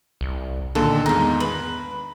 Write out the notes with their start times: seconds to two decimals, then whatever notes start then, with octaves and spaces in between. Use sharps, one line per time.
0.21 C2
0.75 A#2 D3 D#3 A4
1.06 E2 G#2 D#4 F5
1.40 B4 F#7